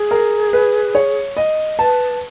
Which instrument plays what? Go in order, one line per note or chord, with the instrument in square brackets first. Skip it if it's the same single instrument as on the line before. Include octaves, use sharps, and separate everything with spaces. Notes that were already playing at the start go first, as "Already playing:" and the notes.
Already playing: [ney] G#4
[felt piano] A#4
B4
C#5
D#5
[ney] B4 [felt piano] A5